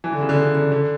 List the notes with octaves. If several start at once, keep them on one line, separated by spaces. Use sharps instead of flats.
E3
D3
C#3
D3
C#3
D3
D3